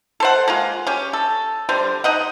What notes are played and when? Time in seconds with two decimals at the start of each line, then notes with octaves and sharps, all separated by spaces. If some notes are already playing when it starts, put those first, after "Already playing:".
0.20 A4 C5 F#5
0.48 G#3 A#3 F4
0.87 C#4 G4
1.13 A4
1.69 D3 G3 C5
2.04 D#4 D#5 F#5